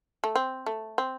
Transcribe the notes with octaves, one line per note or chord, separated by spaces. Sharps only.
A3
C4
A3
C4